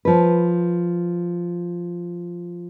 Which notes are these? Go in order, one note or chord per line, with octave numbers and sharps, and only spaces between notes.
F3 B4